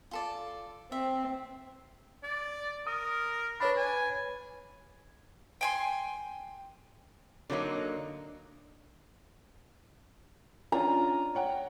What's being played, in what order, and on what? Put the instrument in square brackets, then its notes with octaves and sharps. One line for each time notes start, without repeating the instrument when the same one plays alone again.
[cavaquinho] F4 A4 D5
[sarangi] C4 [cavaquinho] E5
[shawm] D5
[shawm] A#4 [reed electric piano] D#6
[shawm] D4 [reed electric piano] B4 C#5 B5
[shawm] G#5
[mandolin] G5 G#5 C6
[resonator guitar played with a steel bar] D3 F#3 A#3 D#4
[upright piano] C#4 D4 F4 [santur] A#5
[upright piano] C#5 F#5 G5